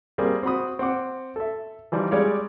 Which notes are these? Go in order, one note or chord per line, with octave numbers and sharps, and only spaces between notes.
G3 A#3 C4 G#4
C4 F#4 B5 D#6
C4 F#5 D6
A4 E5
E3 F3 G3 D#4
G3 G#3 C#5 D5 F5